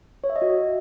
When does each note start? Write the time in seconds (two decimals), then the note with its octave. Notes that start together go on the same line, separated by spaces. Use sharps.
0.24 C#5
0.30 E5
0.36 D#5
0.42 F#4